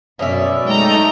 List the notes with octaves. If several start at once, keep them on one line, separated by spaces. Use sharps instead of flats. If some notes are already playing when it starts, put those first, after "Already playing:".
F#2 B2 C#4 D5 E5
G#3 A3 D#4 G5 A#5